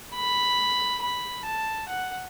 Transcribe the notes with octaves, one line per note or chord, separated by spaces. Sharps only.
B5
B5
A5
F#5